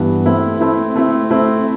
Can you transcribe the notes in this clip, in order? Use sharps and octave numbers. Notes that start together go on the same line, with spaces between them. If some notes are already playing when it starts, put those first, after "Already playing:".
Already playing: G2 E3 B3
A3 C4 E4
A3 C4 E4
A3 C4 E4
A3 C4 E4